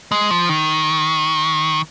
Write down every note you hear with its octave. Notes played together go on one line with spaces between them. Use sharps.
G#3
F3
D#3